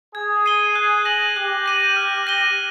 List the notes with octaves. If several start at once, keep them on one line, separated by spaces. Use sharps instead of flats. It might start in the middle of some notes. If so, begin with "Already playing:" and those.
G#4 G#6
C7 D#7 G7
F#6
A#6 D#7 F#7
G4 F#6
A#6 D#7 F#7
F6
A#6 D#7 G7